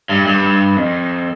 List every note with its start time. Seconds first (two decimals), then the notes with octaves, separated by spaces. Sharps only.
0.09 G2
0.26 G2
0.76 F2